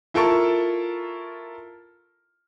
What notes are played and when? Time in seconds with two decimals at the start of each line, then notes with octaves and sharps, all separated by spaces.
0.14 E4 F4 A4 A#4 A5 C#6